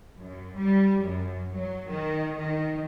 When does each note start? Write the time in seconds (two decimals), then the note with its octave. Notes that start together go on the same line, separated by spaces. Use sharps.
0.16 F#2
0.55 G3
1.03 F#2
1.52 F#3
1.89 D#3
2.36 D#3